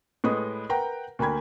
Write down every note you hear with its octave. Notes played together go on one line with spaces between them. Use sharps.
A2 G#3 B4 D#5 B5 D#6
A#4 B4 F#5 G5 A#5
D2 A#3 G5 B5 G#6